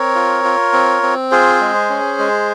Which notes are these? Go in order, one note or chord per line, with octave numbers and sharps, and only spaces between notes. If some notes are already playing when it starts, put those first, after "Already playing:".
Already playing: C4 A#4 C#5
F4
F4
C4
C4
F4 G#4 C5
G#3
C#4
G#3